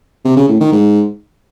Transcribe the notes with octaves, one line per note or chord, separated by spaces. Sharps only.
C3
C#3
A2
D#3
G#2